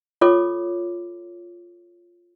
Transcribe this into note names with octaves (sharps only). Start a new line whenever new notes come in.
F4 A4 C#5 D6